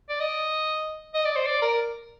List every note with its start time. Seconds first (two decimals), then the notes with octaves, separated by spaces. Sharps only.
0.09 D5
0.20 D#5
1.14 D#5
1.25 D5
1.36 C5
1.46 D5
1.62 A#4